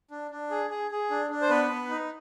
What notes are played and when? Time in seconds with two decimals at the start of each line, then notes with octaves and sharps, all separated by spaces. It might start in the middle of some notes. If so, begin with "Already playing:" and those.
0.11 D4
0.31 D4
0.50 G#4
0.70 G#4
0.91 G#4
1.11 D4
1.31 D4
1.41 C5
1.49 B3 B4
1.70 B3
1.89 D#4